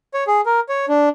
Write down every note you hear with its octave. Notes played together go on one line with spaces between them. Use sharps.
C#5
G#4
A#4
C#5
D4